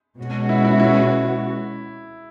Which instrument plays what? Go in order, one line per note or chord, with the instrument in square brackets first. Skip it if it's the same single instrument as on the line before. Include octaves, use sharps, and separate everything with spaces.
[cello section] B2 G#3 C#4 F#4
[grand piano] E4
E4
E4